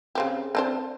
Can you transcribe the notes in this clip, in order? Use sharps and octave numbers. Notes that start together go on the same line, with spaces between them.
C#3 C4 G4
C4 D4 C5